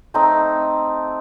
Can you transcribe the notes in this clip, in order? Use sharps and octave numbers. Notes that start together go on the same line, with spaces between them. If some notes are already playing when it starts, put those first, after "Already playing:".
A3 C4 D#4